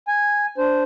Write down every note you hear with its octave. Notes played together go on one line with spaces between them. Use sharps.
G#5
D4 C5